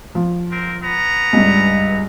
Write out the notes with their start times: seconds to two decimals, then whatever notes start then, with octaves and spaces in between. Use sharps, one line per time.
0.15 F3
0.51 C4 A#4
0.83 B3 A#5
1.33 C#2 G2